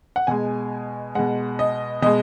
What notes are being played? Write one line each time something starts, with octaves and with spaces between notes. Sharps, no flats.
F#5
B2 G#3 G#5
B2 G#3 F#5
D#5
B2 G#3 D#5